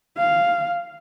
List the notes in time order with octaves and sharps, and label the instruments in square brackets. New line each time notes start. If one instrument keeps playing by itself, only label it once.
[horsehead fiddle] F5